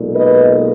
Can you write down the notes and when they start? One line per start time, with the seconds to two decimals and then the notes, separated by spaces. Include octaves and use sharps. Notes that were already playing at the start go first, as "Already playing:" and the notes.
Already playing: B1 A#2 G#3
0.14 B4 D#5